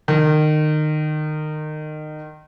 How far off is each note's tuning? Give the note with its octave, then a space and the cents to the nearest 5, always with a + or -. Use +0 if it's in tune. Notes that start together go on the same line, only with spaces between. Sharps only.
D#3 -25